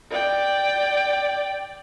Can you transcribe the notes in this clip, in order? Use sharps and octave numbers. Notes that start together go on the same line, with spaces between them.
D5 G5